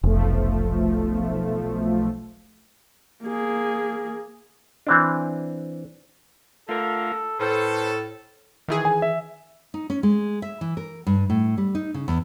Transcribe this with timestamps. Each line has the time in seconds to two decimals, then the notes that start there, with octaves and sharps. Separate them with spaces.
0.03 F1 B1 F3 A3
3.23 A#3 G#4
4.87 E3 C4 D4
6.69 D3 A3 F4 A4 A#4 F5
7.40 A2 A3 C#4 A4 B4 C5
8.68 D#3 E3 G#4
8.85 G#5
9.02 E5
9.74 D#4
9.90 C#4
10.03 G#3
10.42 E5
10.61 E3
10.77 A#4
11.07 G2
11.30 A2
11.58 G3
11.75 D#4
11.94 C#3
12.08 E2